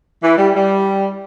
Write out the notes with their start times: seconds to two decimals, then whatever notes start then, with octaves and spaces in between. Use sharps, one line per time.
0.21 E3
0.37 G3
0.54 G3